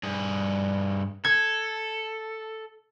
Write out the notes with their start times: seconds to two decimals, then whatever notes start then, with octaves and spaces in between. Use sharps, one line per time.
0.03 G2 G#4
1.25 A4 G#6